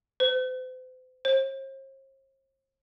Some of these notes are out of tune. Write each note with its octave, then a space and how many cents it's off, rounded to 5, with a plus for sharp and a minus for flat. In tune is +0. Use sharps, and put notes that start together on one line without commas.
C5 -40
C5 +45